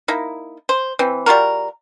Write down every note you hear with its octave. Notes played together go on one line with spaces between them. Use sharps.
A#3 D#4 E4
C5
E3 C4
G3 F4 F#4 A#4